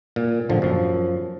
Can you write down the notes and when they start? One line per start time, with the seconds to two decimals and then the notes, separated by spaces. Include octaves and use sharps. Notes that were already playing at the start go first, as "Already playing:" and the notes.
0.16 A#2
0.49 A1 D3 F3
0.62 F#2 F3